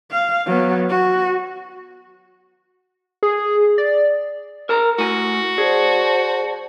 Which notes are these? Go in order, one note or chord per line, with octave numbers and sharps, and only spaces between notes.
F5
F#3 B3
F#4
G#4
D5
A#4 A5 A#5
A2 F#4 G#5
G#4 C5 D5 A5